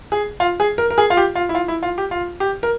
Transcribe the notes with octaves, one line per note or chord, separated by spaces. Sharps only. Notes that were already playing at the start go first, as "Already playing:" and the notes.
G#4
F4
G#4
A#4
A#4
G#4
F4
G4
F4
E4
F4
E4
F4
G4
F4
G4
A#4